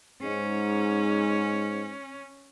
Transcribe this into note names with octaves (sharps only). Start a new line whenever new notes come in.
G#2 C#4